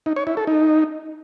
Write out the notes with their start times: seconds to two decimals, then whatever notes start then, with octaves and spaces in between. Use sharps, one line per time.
0.06 D#4
0.16 C#5
0.27 E4
0.37 A4
0.47 D#4